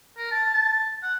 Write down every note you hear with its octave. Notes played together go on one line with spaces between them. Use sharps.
A#4
A5
A5
F#5